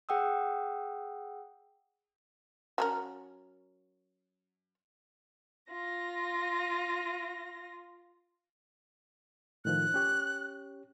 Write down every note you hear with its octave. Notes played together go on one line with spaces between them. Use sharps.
G#4 F#5 G5 D#6 E6
F#3 C#4 A#4
F4 A#6
A2 D#3 F3 F#6
C#4 G4 C#5